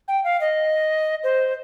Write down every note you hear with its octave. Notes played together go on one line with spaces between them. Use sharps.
G5
F5
D#5
C5